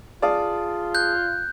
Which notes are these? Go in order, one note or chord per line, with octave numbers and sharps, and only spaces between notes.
F4 G#4 D5 F5 A5 D#6
F#6 G6